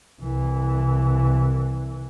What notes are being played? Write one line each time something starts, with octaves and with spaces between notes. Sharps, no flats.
C2 E3